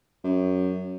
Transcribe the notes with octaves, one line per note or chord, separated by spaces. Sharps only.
F#2